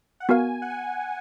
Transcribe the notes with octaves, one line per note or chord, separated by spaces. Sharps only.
F#5
B3 F#4 A#4 F5 G#5
F#5
G#5